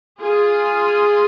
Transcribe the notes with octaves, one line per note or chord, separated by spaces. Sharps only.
F4 G#4